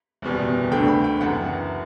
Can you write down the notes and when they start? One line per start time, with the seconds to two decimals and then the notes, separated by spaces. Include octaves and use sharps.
0.22 F#1 E2 B2 G3
0.71 D2 D3 A3 D4 G5
0.88 B5
1.04 G5
1.21 F#1 F#2 E3 F#5